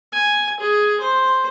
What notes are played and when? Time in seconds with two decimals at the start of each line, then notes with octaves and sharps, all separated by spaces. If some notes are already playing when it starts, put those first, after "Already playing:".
0.12 G#5
0.60 G#4
1.00 C5